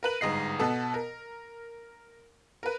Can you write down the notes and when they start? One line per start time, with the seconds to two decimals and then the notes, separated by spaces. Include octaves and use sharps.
0.03 A#4 B4 F#7
0.21 G1 G#2 D#5 C7
0.59 B2 B3 A4
0.94 A#4
2.63 A#4 B4